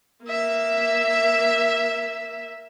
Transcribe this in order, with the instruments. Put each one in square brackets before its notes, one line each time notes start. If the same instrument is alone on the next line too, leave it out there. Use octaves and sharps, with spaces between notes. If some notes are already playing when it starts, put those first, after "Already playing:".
[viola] A#3 E5